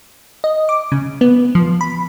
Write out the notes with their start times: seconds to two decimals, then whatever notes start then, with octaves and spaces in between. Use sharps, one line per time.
0.44 D#5
0.69 D6
0.92 C#3
1.21 B3
1.55 F3
1.81 B5